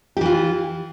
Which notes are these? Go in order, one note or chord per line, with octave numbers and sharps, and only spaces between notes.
E3 F4 G4